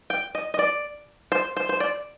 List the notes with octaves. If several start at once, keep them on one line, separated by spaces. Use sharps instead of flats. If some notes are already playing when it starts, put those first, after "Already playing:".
G5
D#5
D#5
D5
C5
C5
C5
D5